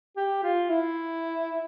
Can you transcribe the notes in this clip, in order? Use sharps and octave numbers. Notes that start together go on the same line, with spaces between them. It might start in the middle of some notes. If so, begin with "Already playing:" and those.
G4
F4
E4